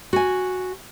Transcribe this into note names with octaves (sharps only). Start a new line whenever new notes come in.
F#4 G#5